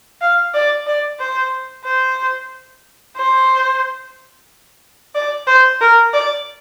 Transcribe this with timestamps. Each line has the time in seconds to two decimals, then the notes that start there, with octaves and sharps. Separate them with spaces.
0.21 F5
0.54 D5
0.87 D5
1.20 C5
1.86 C5
3.17 C5
5.15 D5
5.47 C5
5.81 A#4
6.13 D5